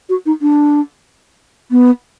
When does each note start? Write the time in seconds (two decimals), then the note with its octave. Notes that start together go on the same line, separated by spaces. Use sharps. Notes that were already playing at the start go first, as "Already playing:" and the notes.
0.09 F#4
0.26 D#4
0.42 D4
1.71 B3